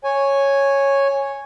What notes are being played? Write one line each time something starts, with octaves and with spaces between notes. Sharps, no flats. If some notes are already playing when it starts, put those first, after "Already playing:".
C#5 G#5